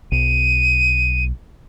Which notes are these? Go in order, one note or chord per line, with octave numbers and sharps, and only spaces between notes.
B1 D#7